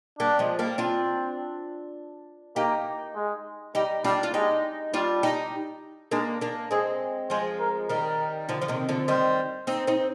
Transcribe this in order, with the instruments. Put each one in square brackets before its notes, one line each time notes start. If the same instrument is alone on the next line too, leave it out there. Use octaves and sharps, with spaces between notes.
[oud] G3 A#3 [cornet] D4
[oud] F3 G#3
G3 A#3
[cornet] C4 [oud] D4 F4
[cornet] A#3 [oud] D#4 G4
[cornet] G#3
[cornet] G3 [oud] D#4 G4
[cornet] G3 [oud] D4 F4
[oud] F4
[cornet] G#3 [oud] D#4 G4
[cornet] G3 [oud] D4 F4
[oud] D#4 G4
[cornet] G#3 [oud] A#3 D4
[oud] A#3 D4
[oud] G#3 C4 [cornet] G#4
[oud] F3 G#3 [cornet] C5
[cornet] A#4
[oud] D#3 G3 [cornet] A#4
[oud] D3 F3
F3
C3 D#3
D3 F3
[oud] D#3 G3 [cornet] C5
[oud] C4 D#4
C4 D#4